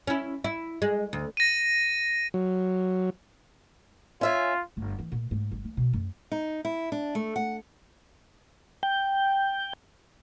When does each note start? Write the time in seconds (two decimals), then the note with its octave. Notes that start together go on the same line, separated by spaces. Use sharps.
0.07 C#4 E4
0.44 E4
0.82 G#3
1.13 D2
1.37 A#6 D#7
2.34 F#3
4.21 C#4 F4 E5 G#5
4.77 G1
4.99 E3
5.12 A#2
5.31 G#2
5.51 G1
5.65 A#3
5.77 B2
5.93 F#2
6.32 D#4
6.65 E4
6.92 D4
7.15 A3
7.36 F#5
8.83 G5